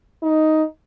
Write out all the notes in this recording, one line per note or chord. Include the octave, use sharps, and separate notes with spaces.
D#4